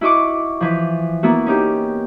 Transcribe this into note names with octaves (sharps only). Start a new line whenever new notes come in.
E4 F#4 D#5 C#6 D6
E3 F3
A#3 B3 E4 F#4
C#4 D#4 G4